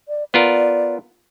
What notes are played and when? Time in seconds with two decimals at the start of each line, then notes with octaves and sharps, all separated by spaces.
0.09 D5
0.34 B3 F4 A#4 D5